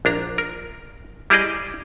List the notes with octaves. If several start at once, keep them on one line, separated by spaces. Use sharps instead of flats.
A#1 D4 A#5
A#4
G3 E4 G4 G#4 D5 D#5